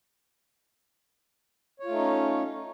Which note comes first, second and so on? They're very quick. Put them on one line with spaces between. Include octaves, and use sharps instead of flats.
C#5 F4 A3 D#4 C#4